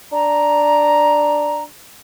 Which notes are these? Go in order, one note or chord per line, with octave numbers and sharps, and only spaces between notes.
D4 A#5